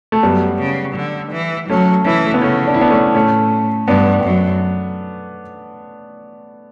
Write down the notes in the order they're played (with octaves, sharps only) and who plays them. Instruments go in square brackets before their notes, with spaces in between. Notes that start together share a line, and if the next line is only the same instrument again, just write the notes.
[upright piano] A3
[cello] F#2 [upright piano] G3 B3
[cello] C#3
D3
E3
[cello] F#3 [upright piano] A3 C#4
[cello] E3 [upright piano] C#4 E4
[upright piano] A3
B3
[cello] C#3 [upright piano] A3 C#4
[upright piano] D4
E4
B3 D4
A3 C#4
[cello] A2 [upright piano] A3 C#4
[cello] G2 [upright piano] B3 D4
[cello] F#2